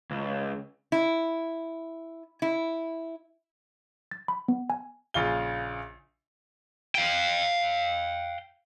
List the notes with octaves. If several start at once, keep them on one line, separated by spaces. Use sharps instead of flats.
C#2
E4
E4
A6
B5
B3
G#5
A#1 C#3 F4 G7
F5 G5